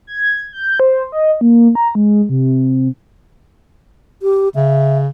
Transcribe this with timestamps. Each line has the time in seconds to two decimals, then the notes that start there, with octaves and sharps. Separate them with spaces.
0.07 G#6
0.53 G6
0.80 C5
1.12 D#5
1.41 A#3
1.75 A#5
1.95 G#3
2.29 C3
4.22 G4
4.56 C#3 E5